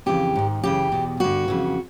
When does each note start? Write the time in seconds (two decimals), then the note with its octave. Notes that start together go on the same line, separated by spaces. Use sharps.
0.06 F2 C#3 E3 G4
0.36 G#2 D#3
0.63 F#2 C#3 E3 G4
0.92 E2 B2
1.20 G2 D3 F#4
1.48 F2 C#3 E3